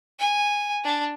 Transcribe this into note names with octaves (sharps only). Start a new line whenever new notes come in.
G#5
D4